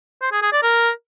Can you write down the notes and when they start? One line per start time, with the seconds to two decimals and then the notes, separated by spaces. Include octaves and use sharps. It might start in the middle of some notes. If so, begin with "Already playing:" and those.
0.22 C5
0.32 G#4
0.42 G#4
0.52 D5
0.63 A#4